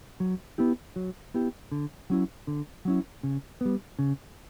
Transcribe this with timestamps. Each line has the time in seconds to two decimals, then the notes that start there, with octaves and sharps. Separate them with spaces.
0.20 F#3
0.58 B3 E4 G4
0.96 F#3
1.34 B3 E4 G4
1.72 D3
2.10 F#3 C#4 E4
2.47 D3
2.85 F#3 C#4 E4
3.23 C#3
3.61 G3 B3
3.99 C#3